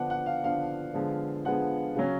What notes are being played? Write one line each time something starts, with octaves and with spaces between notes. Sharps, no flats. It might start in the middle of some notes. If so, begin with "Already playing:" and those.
Already playing: D3 F3 B3 D4 F#5
F#5
F5
D3 F3 B3 D4 F5
D3 F3 G#3 B3
D3 F3 G#3 B3 F#5
C#3 F#3 C#4